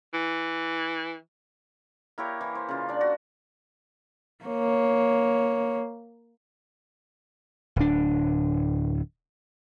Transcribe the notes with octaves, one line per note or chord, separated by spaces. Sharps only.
E3
A#3 E4 G4 C#5
E3
C5
C#3 F4
D4 D5
F#4
A#3 C#5
D1 D4